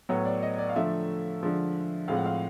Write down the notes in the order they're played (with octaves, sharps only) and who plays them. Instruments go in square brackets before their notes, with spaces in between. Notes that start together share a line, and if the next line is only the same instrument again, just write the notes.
[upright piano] A2 F#3 B3 C#5
D5
D#5
D5
F5
D3 F3 A3 E5
D3 F3 G#3
A2 F3 G#3 C4 F5
F#5
F5